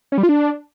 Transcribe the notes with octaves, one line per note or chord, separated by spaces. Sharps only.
C#4
G3
F4
D4